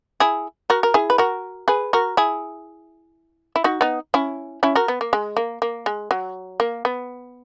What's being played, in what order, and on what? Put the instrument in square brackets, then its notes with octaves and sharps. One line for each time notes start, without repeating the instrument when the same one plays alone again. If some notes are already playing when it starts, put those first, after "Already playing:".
[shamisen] E4 G#4
F#4 A#4
A#4
E4 G#4
B4
F#4 A#4
G#4 B4
F#4 A#4
E4 G#4
E4
D#4 F#4
B3 D#4
C#4 E4
C#4 E4
F#4 A#4
B3
A#3
G#3
A#3
A#3
G#3
F#3
A#3
B3